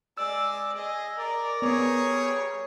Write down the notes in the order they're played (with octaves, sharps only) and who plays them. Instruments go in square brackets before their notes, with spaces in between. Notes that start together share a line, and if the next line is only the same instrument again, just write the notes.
[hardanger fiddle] G#3 D5 [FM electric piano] E6
[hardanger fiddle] G#4 D#5
[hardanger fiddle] A#4 [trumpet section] D5
[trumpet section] G3 G#4 C#5 [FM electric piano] B3